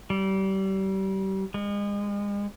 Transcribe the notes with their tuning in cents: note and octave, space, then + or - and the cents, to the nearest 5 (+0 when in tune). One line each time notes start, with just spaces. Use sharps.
G3 -30
G#3 -35